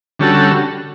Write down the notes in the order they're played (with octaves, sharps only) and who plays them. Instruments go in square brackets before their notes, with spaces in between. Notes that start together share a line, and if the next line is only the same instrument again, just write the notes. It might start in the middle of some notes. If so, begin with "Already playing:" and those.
[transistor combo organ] D3 G3 C#4 F#4 A4